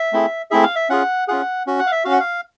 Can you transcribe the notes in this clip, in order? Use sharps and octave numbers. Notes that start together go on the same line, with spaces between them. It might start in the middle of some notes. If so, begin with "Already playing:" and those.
Already playing: E5
A3 C4 E4 G#4
A3 C4 E4 G#4 E5
F5
E5
C#4 F4 G#4 F#5
C#4 F4 G#4 F#5
C#4 F#4
F#5
F5
E5
C#4 F#4 F5
F#5
F5